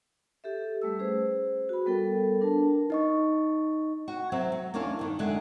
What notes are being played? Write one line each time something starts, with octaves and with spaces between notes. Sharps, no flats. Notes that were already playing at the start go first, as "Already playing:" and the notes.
G4 A4 E5
G3 A3 E6
C#4 G#4 B4 C5
F#4 B5
G3 B3 A4 A#4 G5
D4 A#4 B4 A5
D#4 D#5 C#6
F#4
F#3 C4 E5
F#3
E2 A#3 C#4 D4 F5 A5
G2 D#3
F#2 D3 G#3 E5 F#5